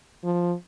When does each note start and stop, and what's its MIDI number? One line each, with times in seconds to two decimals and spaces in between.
0.24 0.54 53